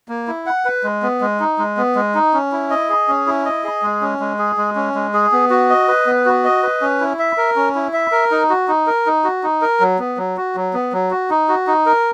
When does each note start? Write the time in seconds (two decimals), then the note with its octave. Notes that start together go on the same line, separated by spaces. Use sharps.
0.09 A#3
0.27 E4
0.46 F#5
0.65 B4
0.84 G#3
1.02 B3
1.21 G#3
1.40 D#4
1.58 G#3
1.77 B3
1.95 G#3
2.15 D#4
2.34 C#4
2.52 E4
2.70 D#5
2.89 G#4
3.08 C#4
3.27 E4
3.45 D#5
3.64 G#4
3.82 G#3
4.01 C#4
4.20 G#3
4.39 G#4
4.57 G#3
4.76 C#4
4.95 G#3
5.14 G#4
5.32 B3
5.50 F#4
5.70 D#5
5.88 B4
6.06 B3
6.25 F#4
6.44 D#5
6.63 B4
6.81 C#4
7.00 E4
7.19 E5
7.37 A#4
7.56 C#4
7.75 E4
7.93 E5
8.12 A#4
8.31 D#4
8.49 F#4
8.68 D#4
8.87 A#4
9.06 D#4
9.24 F#4
9.43 D#4
9.62 A#4
9.80 F#3
9.99 B3
10.17 F#3
10.37 F#4
10.56 F#3
10.73 B3
10.93 F#3
11.11 F#4
11.30 D#4
11.49 F#4
11.67 D#4
11.86 A#4